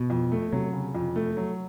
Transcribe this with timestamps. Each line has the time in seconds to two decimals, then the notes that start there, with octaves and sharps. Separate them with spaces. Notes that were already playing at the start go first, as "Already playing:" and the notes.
Already playing: B2
0.10 F2
0.32 A3
0.52 C3 F#3
0.73 C#3
0.95 F2
1.16 A3
1.37 F#3